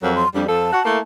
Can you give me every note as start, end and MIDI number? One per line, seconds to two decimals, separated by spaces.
0.03 0.23 41
0.03 0.23 54
0.03 0.13 70
0.16 0.28 84
0.35 0.44 41
0.35 0.44 55
0.35 0.45 62
0.47 0.72 41
0.47 0.72 53
0.47 0.72 69
0.47 1.00 81
0.73 0.80 66
0.85 0.98 57
0.85 0.98 58
0.85 0.98 64